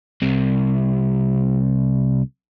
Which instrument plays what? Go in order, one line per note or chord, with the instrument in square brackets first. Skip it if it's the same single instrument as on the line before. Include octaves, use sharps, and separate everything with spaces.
[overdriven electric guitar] C2 C3